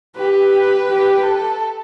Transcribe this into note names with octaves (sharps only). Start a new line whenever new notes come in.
G4 B4
G4
A4